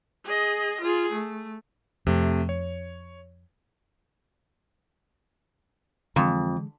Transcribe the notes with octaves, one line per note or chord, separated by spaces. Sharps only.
G#4 D#5
F4 G#4
A3
F2 C3 A3
C#5
F2 D3 E3 G#3